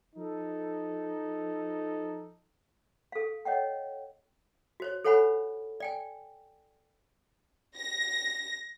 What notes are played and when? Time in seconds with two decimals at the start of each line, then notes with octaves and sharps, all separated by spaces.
0.16 F3 D#4 A4
3.12 A4 F5
3.45 C#5 D#5 F#5 G5
4.80 F#4 C5 C#5
5.05 A4 C5 C#5 F#5 G#5 B5
5.80 D5 G5 G#5
7.76 A#6